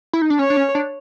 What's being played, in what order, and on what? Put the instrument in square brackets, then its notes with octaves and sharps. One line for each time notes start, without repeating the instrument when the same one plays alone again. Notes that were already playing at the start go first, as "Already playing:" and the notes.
[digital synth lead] E4
D#4
D4
[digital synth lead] C#4 [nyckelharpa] C#5
[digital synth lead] D4
C#4
D4